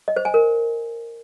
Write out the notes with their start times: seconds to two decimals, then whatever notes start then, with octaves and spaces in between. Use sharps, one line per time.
0.08 D#5
0.16 C5
0.25 G#5
0.34 A#4